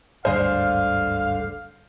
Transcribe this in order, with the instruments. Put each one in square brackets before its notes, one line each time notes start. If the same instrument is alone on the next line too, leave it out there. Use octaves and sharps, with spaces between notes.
[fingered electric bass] G#1 D2 G2 [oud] D3 G#4 [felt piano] C5 [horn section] F5